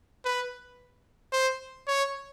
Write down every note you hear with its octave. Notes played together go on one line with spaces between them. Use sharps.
B4
C5
C#5